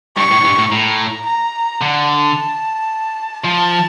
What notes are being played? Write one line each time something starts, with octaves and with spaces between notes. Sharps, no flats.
G2 C#6
A2
G2
A2
A2 A#5
A#5
D3 A5
F3 A5